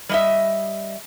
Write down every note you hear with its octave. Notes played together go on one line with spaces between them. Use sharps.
G3 D#5 E5